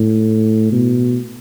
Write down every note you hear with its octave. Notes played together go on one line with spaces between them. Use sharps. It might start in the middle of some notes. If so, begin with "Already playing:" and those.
Already playing: A2
B2